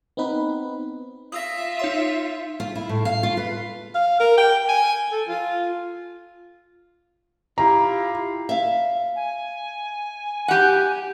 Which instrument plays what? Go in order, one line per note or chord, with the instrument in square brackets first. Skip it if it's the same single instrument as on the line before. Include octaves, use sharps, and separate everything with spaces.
[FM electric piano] B3 C4 D#4 B4
[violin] F4 E5 [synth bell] D#6 E6 A#6
[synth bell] D#4 C#5 C6
[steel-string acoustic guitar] F4
E4
A2
F5
F4
B4
[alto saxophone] F5
A#4
G5
G#5
A4
F4
[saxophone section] E4 F4 G4 [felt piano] A#5
[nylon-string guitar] E5 F5
[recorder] G#5
[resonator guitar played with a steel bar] G4 F#5